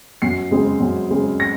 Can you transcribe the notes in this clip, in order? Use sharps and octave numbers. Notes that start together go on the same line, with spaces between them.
F#2 C7
C#3 G#3 C4
F#2
C#3 G#3 C4
A#6